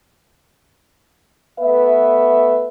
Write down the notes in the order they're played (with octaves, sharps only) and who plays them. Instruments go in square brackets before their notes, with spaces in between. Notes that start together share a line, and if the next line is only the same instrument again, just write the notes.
[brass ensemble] A3 B3 B4 E5